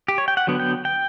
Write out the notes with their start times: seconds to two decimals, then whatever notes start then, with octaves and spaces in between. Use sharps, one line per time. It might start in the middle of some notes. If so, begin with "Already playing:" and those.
0.08 G4
0.18 C#5
0.28 G5
0.37 F#5
0.47 D3 F#3 B3
0.60 G5
0.85 G5